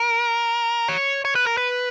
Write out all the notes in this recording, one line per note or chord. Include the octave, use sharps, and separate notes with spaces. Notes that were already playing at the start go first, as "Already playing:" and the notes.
Already playing: A#4
C#5
C#5
B4
A#4
B4